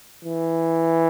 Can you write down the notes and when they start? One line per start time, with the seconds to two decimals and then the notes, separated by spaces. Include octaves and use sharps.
0.25 E3